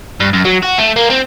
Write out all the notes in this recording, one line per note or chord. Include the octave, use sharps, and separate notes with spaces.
G2
F#2
F#3
F#4
A3
A#3
C4